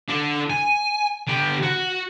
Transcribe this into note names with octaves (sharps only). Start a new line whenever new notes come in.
D4 A4
G#5
D3 G4
F#4